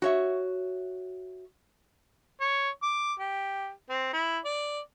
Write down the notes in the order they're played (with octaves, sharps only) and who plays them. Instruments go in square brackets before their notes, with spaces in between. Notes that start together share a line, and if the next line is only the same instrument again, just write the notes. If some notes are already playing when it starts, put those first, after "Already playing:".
[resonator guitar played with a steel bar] F#4 C#5 E5
[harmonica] C#5
D6
G4
C4
E4
D5